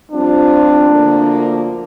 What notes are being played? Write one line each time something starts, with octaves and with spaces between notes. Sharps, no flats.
G2 F3 C4 D4 F4
D2 D3 F3 A#3